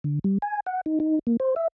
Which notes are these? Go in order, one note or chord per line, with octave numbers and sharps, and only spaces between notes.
D3
G3
G#5
F#5
D#4
D#4
A#3
C5
E5